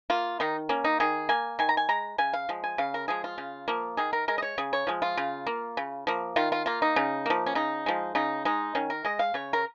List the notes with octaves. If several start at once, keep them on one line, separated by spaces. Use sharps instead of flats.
A#3 F4
D#3 D#4
A#3 C#4
D#4
D#3 G#4
A#3 G#5
D#3 G#5
A#5
G#5
G#3 A#5
C#3 G#5
F5
F3 G#3
G#5
C#3 F5
A#4
F3 G#3 G#4
F4
C#3
F3 A#3
D#3 G#4
A#4
G#3 A#4
D#5
C#5
C#3 G#4
C#5
F3 G#3
F4
C#3
A#3
C#3
F3 A#3
D#3 F4
F4
A#3 F4
D#4
C#3
F3 A#3
C#4
C#3 D#4
F3 G#3
C#3 D#4
G#3 D#4
D#3 C#4
A#4
G#3 D#5
F5
C#3 C#5
A#4